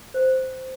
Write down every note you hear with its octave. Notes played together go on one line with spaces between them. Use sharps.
C5